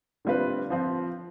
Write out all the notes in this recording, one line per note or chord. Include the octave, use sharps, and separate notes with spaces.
D3 G3 C4 F4 B4
F3 C4 F4